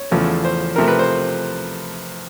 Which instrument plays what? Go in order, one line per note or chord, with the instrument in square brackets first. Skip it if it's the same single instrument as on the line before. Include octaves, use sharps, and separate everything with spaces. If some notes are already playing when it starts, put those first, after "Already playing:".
Already playing: [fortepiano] C#5
E2 C#3 F3 A3
C5
C3 F3 A3 A#4
B4
C5